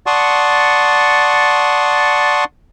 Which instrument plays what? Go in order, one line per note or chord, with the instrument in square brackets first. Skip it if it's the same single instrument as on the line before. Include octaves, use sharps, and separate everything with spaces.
[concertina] D5 F#5 A5 C6 C#6 D#6